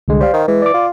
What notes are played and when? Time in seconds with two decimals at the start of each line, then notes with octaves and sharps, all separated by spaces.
0.08 C2 D3 G#3
0.21 G3 C5 F5
0.33 D#3
0.48 E3 G#3
0.62 D5 D6
0.74 F4